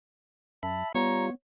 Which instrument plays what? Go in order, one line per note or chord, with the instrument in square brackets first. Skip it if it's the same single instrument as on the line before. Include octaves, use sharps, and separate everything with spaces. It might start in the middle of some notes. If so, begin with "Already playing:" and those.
[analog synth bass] F#2 [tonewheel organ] E5 B5 [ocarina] A5
[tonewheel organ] G3 F4 [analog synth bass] B3 [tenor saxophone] C#5 [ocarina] A#5